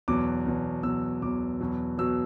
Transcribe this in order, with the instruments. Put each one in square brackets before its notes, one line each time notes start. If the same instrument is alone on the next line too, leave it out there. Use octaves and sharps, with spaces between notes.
[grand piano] E2 B2 F#3 D6
E2 B2 F#3
E2 B2 F#3 E6
E2 B2 F#3 D6
E2 B2 F#3
B2 F#3 E6